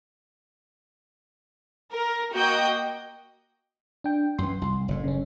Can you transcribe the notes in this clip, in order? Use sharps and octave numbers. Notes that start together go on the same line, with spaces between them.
A#4
A#3 F#4 D#5 G5 G6
D4 G5
F#2 E3 C6
C2
F#1 A2
C#3 C#4